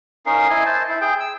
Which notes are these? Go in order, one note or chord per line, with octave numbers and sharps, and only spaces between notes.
C#4 D#4 A#4 F5
E4 D#5 G#5
C5 A5
E4
G#4 G5
E6